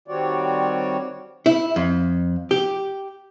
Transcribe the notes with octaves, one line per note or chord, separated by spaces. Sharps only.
D#3 G3 C4 F#4 C#5 D5
E4
F2
G4